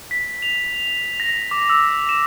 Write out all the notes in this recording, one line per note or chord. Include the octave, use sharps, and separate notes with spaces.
B6
F7
A#6
D6
E6
E7